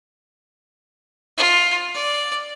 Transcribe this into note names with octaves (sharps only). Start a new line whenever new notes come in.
F4
D5